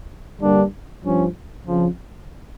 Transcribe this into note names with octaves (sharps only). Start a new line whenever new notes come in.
G2 D3 G3 A#3 D4
G2 F3 C#4
F2 C#3 F3